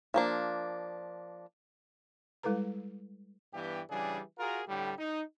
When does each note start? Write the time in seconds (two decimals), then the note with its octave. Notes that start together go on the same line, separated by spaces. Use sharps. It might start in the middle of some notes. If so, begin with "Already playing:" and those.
0.14 F3 A#3 D4
2.43 G3 G#3 E4 A4 B4 A#5
3.54 G2 E3 B3 G4
3.90 C#3 E3 G3 D4 G#4
4.39 F4 F#4 G#4 A#4
4.68 A2 D3 G3 A3 G4
4.99 D#4